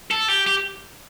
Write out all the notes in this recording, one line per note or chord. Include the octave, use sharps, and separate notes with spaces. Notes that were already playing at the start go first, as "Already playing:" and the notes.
A4
G4
G4